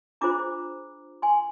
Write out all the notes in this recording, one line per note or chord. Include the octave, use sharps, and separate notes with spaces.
D4 F4 G#4 C5 A#5 D6
G#5 C6